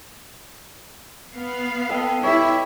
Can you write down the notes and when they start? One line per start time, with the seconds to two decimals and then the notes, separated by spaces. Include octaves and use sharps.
1.34 B3 F5
1.89 A4 D#5 G5
2.23 E4 G4 B4 C#5 E5